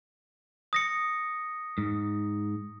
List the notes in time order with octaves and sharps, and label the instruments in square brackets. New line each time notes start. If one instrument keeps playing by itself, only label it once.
[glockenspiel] D#6 A#6 C#7
[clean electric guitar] G#2